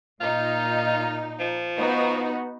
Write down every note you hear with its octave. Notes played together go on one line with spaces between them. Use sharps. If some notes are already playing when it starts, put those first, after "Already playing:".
A#2 D#4 F4
F3
B3 D#4 F#4